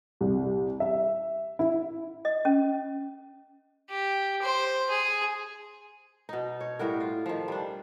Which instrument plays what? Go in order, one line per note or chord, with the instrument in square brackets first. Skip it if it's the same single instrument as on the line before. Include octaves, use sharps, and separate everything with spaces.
[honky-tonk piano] C2
E5
E4
[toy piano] D#5
C#4
[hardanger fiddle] G4
C5
G#4
[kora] B2 D#4
C#5
A2 G3 F#4 A#4
F4
D#3 F3
G3 D4